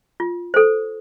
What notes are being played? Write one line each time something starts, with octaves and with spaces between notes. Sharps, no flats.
F4
A4 C5